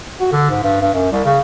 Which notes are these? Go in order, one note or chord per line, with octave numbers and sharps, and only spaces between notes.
F#4
D3
G#2
G2
G2
F#2
C2
C#3